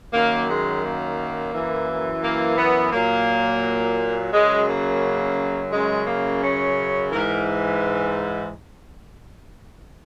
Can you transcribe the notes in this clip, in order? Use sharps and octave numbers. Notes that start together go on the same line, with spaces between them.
F#2 D#3 F#3 A#3
G#3
A#3
F#2 E3
A#3
B3
A#2 F#3 A#3
F#2 C#3 F#3 G#3
A#3
F#2 C#3 F#3 G#3
A#3
C#4
G#2 E3 A#4